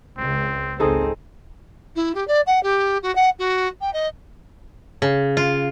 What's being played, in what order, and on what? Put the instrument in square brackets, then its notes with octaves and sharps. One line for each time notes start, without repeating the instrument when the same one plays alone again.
[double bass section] C#2 [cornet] C4
[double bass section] G#1 C#2 C4 [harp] D#4 G#4 A4
[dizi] E4
G4
D5
F#5
G4
F#4
F#5
F#4
G5
D#5
[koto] C#3
F4